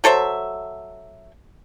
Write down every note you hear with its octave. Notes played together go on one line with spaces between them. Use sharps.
F#3 A4 C5 E5